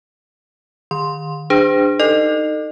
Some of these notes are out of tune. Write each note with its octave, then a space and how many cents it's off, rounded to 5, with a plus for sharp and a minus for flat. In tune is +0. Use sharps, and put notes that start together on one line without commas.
D#3 -25 C6 +0
D4 +15 G#4 -40 C5 -40
D#4 +0 A4 +40 D#5 -35